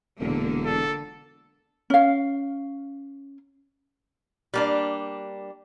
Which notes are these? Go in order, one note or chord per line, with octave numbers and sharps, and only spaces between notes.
E1 A#2 D3 A#3
A4
C#4 F5
G3 A#3 D4